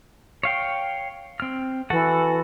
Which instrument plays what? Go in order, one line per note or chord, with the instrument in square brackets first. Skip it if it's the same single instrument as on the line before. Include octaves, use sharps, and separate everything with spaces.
[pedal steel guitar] C#5 F5 G5
C4 F6
[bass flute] E3 [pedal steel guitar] F#4 A4 F#5